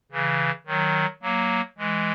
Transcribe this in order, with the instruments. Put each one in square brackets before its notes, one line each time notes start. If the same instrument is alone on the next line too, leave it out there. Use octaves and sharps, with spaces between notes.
[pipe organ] C#3 E3
D#3 F#3
F#3 A#3
E3 G#3